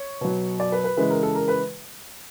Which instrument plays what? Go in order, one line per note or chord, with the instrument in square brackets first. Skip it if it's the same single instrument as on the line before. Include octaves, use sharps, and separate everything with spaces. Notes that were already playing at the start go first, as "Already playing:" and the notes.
Already playing: [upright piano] C#5
B2 F#3
D5
B4
B4
C#3 E3 G#3 B4
A#4
A4
A#4
B4